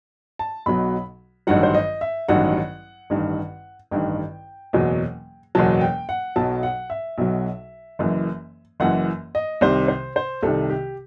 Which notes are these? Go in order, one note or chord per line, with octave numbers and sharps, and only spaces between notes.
A5
B1 B2 F#3 B5
A1 G2 D#3 F#3 F#5
C5
D#5
E5
A1 G2 D#3 F#3 F#5
A1 G2 D#3
A1 G2 D#3 G5
F#1 E2 B2 F#3
F#1 E2 B2 F#3 A5
G5
F#5
B1 B2 F#3 A5
F#5
E5
B1 B2 F#3
F#1 F#2 E3
F#1 F#2 E3 F#5
D#5
C2 C3 D#3 C5
C5
C5
C2 C3 D#3 A4
G4